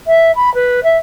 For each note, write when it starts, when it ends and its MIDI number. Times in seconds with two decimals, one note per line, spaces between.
0.07 0.31 76
0.35 0.53 83
0.54 0.80 71
0.84 0.97 76